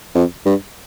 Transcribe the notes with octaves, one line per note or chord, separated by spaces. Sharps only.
F2
G2